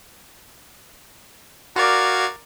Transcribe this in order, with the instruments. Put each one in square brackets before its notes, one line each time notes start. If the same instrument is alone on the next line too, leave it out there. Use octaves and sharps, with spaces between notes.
[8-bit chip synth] F#4 F5 G#6 [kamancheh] A#4 D5